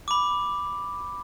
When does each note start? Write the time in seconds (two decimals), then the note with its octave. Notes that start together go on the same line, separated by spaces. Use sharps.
0.08 B5 D6